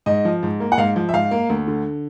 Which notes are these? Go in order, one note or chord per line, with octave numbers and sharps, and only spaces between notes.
G#2 D#5
F3
G#2
A#3
F#5
G#2 F5
F3
E5
G#2 F5
A#3
D2
D3